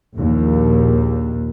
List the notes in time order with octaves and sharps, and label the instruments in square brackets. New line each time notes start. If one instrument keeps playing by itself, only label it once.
[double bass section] A#1 D#2 A#2